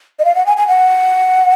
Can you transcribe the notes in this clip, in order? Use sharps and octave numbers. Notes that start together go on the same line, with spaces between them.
D#5
F5
F#5
G#5
G#5
F#5